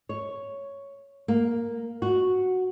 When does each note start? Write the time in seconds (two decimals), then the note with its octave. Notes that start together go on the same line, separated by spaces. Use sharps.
0.09 C#5
1.28 A#3
2.02 F#4